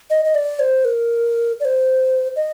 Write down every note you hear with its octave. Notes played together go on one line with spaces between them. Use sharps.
D#5
D#5
D5
C5
A#4
D5
C5
D#5